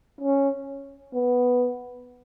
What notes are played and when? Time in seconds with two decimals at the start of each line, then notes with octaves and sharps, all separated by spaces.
0.21 C#4
1.14 B3